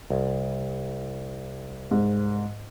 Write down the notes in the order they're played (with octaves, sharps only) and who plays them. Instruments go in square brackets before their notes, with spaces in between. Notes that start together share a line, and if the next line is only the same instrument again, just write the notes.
[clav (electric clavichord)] C2
[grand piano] G#2